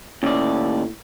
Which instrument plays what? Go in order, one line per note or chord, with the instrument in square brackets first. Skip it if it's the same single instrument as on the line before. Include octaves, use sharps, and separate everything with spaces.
[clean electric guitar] D#2 D5 [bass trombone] A2 [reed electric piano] C#4